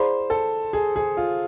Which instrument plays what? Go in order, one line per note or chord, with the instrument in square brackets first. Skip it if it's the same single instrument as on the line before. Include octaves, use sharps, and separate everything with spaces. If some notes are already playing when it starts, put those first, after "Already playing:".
Already playing: [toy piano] E4 G#4 D5 F5 B5 [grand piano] C5
[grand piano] A4
G#4
G#4
F4